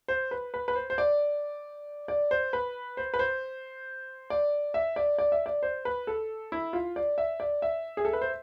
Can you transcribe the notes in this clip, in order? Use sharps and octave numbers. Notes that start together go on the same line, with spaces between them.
C5
B4
B4
B4
C5
C5
D5
D5
C5
B4
C5
B4
C5
D5
E5
D5
D5
E5
D5
C5
B4
A4
E4
F4
D5
E5
D5
E5
G#4
A4
B4
C5